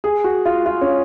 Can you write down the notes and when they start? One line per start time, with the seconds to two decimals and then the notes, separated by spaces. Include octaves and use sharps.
0.04 G#4
0.24 F#4
0.46 F4
0.66 F4
0.81 C#4